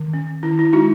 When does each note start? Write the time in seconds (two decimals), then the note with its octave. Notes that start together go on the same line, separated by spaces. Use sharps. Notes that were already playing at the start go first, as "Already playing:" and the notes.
Already playing: D#3
0.13 C#4
0.43 D#3 E4
0.59 E4
0.73 G#3 D#4 F#4